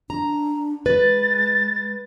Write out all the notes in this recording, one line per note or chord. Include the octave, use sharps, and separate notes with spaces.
D4 A#5
G#3 B4 A6